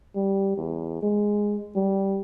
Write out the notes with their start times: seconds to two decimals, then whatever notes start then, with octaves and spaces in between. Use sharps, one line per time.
0.16 G3
0.57 E2
1.03 G#3
1.76 G3